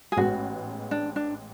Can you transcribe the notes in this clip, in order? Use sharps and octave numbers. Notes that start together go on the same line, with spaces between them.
G#4
A1 G#2 G#3 B3 F#4
D4
D4